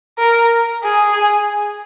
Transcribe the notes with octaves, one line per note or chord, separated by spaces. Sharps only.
A#4
G#4